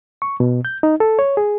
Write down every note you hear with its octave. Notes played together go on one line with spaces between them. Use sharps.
C#6
B2
G6
D#4
A4
C#5
G#4